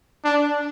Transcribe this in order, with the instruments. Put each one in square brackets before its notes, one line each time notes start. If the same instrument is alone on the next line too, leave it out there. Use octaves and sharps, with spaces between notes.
[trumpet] D4